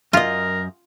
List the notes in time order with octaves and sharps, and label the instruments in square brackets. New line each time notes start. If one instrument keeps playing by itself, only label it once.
[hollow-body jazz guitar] F#2 D#5 [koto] F4 [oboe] A#4